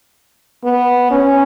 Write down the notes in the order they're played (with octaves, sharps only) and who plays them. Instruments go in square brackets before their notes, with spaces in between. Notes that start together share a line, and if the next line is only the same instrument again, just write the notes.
[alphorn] B3
C#4